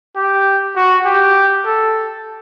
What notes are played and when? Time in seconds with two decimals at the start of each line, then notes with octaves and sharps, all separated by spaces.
0.16 G4
0.76 F#4
1.05 G4
1.66 A4